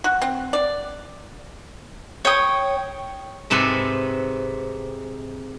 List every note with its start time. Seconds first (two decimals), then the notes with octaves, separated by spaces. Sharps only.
0.04 F#4
0.22 C4
0.53 D5
2.25 C#5 G5 D#6
3.50 G#2 C3 C4 A4 B4